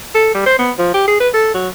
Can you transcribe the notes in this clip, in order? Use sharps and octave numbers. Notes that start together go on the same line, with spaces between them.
A4
G3
C5
B3
F3
G4
G#4
B4
A4
F#3